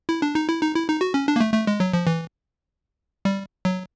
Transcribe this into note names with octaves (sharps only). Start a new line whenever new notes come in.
E4
D4
D#4
E4
D#4
E4
D#4
F#4
C#4
D4
A#3
A3
A3
G#3
F#3
F3
E3
G3
F#3